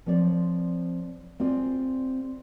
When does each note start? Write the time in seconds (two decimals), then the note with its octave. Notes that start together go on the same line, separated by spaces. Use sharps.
0.06 F3 C4 C#5 D5
1.40 C4 F4 G#4 D5